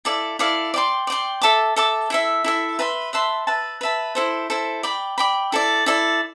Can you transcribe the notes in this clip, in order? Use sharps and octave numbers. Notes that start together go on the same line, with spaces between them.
E4 A4 D5 F5
E4 A4 D5 F5
D5 G5 C6
D5 G5 C6
A4 E5 A5 D6
A4 E5 A5 D6
E4 A4 E5
E4 A4 E5
B4 E5 A5 C6
B4 E5 A5 C6
B4 E5 A5
B4 E5 A5
E4 A4 C5
E4 A4 C5
D5 G5 B5
D5 G5 B5
E4 A4 D5
E4 A4 D5